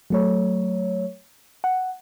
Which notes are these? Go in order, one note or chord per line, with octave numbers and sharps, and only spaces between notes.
F#3 A3 C#5
F#5